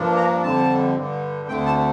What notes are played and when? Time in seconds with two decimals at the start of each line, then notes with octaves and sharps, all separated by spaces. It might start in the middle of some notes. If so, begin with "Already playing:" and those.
Already playing: G2 F3 A#3 D4
0.16 A#5
0.43 F2 D3 G3 C4 A5
0.95 G2 D3 G3
1.48 D2 D3 A3 C4 G5
1.66 A5